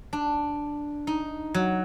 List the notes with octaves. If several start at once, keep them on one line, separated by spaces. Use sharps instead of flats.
D4
D#4
F#3